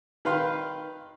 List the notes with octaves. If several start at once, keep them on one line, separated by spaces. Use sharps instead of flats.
D#3 B4 F5 C6